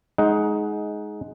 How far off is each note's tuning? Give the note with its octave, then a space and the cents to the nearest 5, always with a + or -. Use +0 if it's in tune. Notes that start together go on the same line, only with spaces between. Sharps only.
G#3 +15 D#4 +10 F#5 +0